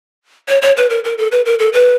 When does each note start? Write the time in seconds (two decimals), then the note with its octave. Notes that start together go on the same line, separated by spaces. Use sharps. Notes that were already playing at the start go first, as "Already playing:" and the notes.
0.49 C#5
0.62 C#5
0.77 B4
0.90 A#4
1.04 A#4
1.18 A4
1.32 B4
1.46 A#4
1.59 A4
1.73 B4